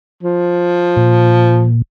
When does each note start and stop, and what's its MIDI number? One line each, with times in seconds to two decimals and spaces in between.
0.23 1.70 53
0.97 1.82 46